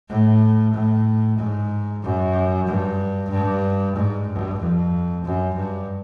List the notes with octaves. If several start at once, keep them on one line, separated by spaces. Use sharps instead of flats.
A2
A2
G#2
F#2
G2
G2
G#2
G2
F2
F#2
G2